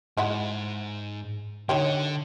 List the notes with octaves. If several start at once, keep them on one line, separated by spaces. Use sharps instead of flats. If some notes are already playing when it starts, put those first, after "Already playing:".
G#2 G#3 E4 F#5
D3 D#4 C#5 G5